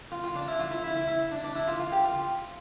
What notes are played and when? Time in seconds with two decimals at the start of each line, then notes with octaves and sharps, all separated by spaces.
0.12 F4
0.24 F4
0.35 D4
0.48 E4
0.60 F4
0.71 E4
0.84 E4
0.96 E4
1.08 E4
1.32 D4
1.44 D4
1.56 E4
1.68 F4
1.80 F4
1.92 G4
2.04 F4